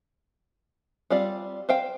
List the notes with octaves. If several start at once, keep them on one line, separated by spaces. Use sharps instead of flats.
G3 C4 F4 D5
C5 F5 G5